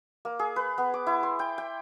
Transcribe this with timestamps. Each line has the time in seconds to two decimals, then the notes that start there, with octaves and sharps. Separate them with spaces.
0.25 A#3
0.39 G#4
0.56 B4
0.78 B3
0.94 D6
1.07 E4
1.23 C6
1.39 G5
1.58 G5